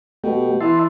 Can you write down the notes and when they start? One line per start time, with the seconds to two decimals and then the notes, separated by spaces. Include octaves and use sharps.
0.24 B2 A3 G4
0.61 E3 E5 A5 C6